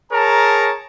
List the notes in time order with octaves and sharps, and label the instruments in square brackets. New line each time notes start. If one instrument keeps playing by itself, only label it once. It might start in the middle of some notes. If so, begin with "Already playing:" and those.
[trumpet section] G#4 A#4 C#5 A5 A#5